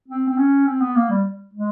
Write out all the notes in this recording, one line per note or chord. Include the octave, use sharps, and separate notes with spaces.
C4
C4
C#4
C4
B3
A#3
G3
G#3